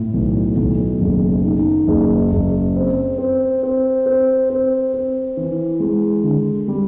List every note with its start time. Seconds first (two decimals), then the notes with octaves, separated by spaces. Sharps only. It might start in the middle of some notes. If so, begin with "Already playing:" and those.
Already playing: A2
0.14 B1
0.57 B1
1.01 F#1
1.45 D#3
1.88 F#1
2.32 F#1
2.76 C4
3.18 C4
3.63 C4
4.06 C4
4.50 C4
4.94 C4
5.37 E3
5.80 G#3
6.24 D3
6.68 G3